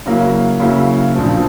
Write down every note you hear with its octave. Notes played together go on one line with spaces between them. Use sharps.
C#3 F#3 A#3 C#4 E4
C#3 F#3 A#3 C#4 E4
A#1 A#2 F3 A3 C4